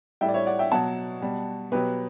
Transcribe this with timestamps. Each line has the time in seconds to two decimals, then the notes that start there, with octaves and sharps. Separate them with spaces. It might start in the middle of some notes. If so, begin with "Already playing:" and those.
0.21 A2 G3 E5 G5
0.29 D5
0.34 C#5 E5
0.46 D5 F#5
0.59 E5 G5
0.72 B2 F#3 F#5 A5
1.22 B2 G3
1.72 B2 F#3 G4 B4